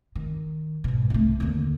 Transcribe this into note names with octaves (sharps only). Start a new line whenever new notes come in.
D#3
G#2 B2
C2 A3
D#2 D3